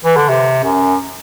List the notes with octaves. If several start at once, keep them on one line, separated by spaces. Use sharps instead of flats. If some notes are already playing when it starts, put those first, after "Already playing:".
E3
D3
C3
F#2